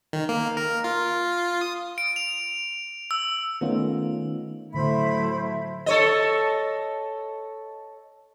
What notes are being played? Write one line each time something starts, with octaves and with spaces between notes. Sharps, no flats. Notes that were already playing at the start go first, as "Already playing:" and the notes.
D#3
A#3
A#4
F4
D#6
D7
F7
E6
D#3 A3 B3 C#4 D#4 F4
A2 D3 F#3 A3 E4 C5 B5
A4 C#5 D#5